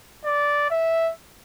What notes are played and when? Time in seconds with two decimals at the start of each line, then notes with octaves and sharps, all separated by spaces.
0.25 D5
0.70 E5